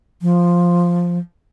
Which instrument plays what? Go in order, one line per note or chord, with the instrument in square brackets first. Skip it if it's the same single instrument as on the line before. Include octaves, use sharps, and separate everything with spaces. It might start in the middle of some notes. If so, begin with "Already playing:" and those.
[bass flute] F3